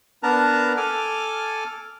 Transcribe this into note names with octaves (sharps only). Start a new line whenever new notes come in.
B3 D4 A#4 B4 A5 A#5
A4 G#5 D6 F6